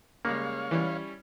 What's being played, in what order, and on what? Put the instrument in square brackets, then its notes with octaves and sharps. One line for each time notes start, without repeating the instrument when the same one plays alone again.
[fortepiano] C#3 G3 G#3 [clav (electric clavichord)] A#3 [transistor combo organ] C#5 F5
[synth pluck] E3 [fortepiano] G3 C#4 E4